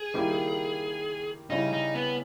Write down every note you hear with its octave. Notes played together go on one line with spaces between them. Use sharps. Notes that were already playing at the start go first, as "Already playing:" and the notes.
Already playing: G#4
D#3 G3 A#3 E4 G4
C#3 G3 C#4 D#4 E4
D#4
B3